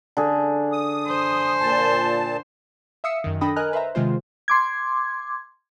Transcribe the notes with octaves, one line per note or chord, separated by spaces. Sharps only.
D3 G#4
D#6
C5
A#2 A5
E5 F5 D#6 E6 C7 C#7
F#2 D#3
D4 A4 G5 B5 D#6 A#6
A#4 D#5 G#5 A#5 F6 F#6
B4 C5 E5 A#5
C3 D#3 G#3 F4 C5
C6 D6 G#6